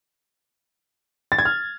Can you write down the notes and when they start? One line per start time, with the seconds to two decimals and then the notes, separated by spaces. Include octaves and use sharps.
1.32 A6
1.39 G#6
1.45 F6